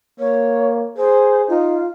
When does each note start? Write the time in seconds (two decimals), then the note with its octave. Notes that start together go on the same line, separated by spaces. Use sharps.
0.20 A#3 C#5
0.97 G#4 C5
1.49 D#4 F4